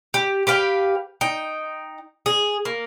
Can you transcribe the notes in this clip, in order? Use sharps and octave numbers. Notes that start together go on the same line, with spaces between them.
G4
G4 B4 F5 G5
D#4 G5
G#4
A#3